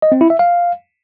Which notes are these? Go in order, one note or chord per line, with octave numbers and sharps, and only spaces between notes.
D#5
C4
E4
E5
F5